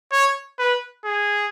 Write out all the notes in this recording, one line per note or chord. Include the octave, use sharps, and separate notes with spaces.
C#5
B4
G#4